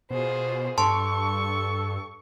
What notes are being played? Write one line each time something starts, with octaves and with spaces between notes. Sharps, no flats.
B2 F4 G#4 C5
G2 A4 A5 C6 C#6